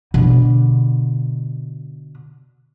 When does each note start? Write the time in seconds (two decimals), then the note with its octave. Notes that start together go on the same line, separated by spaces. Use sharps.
0.14 B2 D3